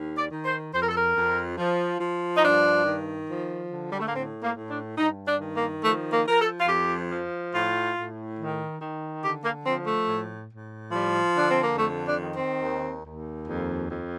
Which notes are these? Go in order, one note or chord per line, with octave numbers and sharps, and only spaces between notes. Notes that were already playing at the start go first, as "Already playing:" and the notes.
Already playing: D#2
D5
D#3
C5
F2 C5
A#4
A4
A#4
F2
F3
F3
D#4
G2 D4
D#3
F3
D3
G3
A3
A#3
A2 C4
A#3
A2
D4
G2 D#4
D4
D#3
A#3
F3 A3
A#3
F3 A#4
A4
F4
F2 G4
F3
A2 F4
A2
D#3
D#3
D3 G4
A#3
F3 C4
A3
A2
A2
F3 G3
D3 D4
C4
A#3
F2 A3
D4
D#3
C4
D#2
D#2
F2
F2